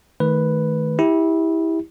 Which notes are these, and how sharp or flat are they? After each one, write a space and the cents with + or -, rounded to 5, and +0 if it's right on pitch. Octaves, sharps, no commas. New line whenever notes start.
D#3 +5 A3 -20 B4 +0
E4 -20 G4 +15